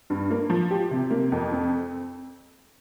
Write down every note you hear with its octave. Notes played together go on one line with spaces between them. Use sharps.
G2
A#3
F3
G4
C3
A#3
F2
C4